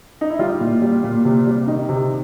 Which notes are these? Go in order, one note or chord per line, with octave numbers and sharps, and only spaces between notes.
D#4
E4
G3 F4
A#2
G3
A#2
C3
G3
D#3 D#4
C3